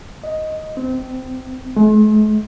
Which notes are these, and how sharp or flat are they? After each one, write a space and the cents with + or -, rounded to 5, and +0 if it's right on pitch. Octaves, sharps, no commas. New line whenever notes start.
D#5 +5
C4 -20
G#3 +45